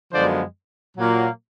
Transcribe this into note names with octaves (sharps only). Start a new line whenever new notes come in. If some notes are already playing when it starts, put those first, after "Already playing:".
F#2 D3 F3 G#3 B3 C5 D5
A#2 F#3 A#3